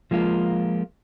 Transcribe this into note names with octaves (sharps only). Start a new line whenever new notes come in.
F3 G#3 A#3 F4